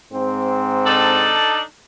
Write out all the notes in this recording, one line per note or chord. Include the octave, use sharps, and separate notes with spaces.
G#2 C4
D4 D#4 A4